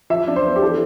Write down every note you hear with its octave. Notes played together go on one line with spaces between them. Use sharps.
F3 E5
D4
C5
B3
G4
E3 A4